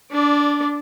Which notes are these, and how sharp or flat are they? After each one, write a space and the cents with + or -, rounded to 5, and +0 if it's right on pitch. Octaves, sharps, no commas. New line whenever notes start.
D4 -20 D5 +0